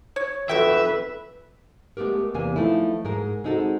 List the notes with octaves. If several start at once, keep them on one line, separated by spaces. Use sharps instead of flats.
C#5
F2 F#4 B4 E5 G5
G#3 A3 B3 G4 A#4
E2 C3 A#3 G#5
F3 A3 D#4 E4
G#2 G#3 A#4
G#3 C4 D#4 F#4 A4